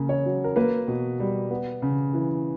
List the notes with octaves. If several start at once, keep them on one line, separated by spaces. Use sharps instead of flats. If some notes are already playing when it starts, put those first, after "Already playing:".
Already playing: C#3 A#3
C#5
F#3
A#4
A#3 B4
B2
G3
B3
C#3
E3